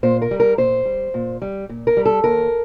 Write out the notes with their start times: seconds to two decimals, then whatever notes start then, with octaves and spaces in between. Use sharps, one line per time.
0.03 A#2 C5
0.22 A#4
0.31 G3
0.40 A#4
0.58 A#2 C5
0.85 G3
1.14 A#2
1.42 G3
1.69 A#2
1.87 A#4
1.97 G3
2.05 A4
2.24 D#2 A#4